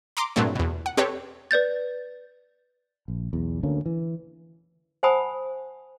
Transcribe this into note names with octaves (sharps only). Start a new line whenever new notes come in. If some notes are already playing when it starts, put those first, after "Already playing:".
A#5 C6 D6
G2 A#2 F#3 A3 C4
E2 B2
F#5
C4 G4 A4 B4 C#5
B4 D5 G6 A6
A#1
B1 E2
D2 D3 A#3 C#4
E3
C5 F#5 G#5 A5 B5 D#6